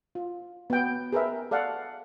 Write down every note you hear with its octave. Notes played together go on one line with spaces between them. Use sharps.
F4
B3 G5
G#4 A#4 B4 E5
A4 D5 F5 F#5